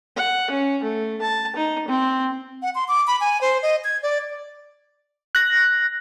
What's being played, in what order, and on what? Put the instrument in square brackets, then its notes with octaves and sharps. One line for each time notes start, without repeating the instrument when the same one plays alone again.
[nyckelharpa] F#5
C#4
A3
A5
D#4
C4
[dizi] F#5
C6
D6
B5
G#5
C5
D#5
G#6
D5
[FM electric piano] F#6 A#6